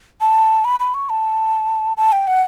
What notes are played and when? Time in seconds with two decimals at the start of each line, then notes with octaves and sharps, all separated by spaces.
0.21 A5
0.65 B5
0.80 B5
0.94 C#6
1.09 A5
1.97 A5
2.12 G5
2.27 F#5